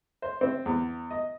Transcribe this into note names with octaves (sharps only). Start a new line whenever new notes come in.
C5
C4
E2
D#5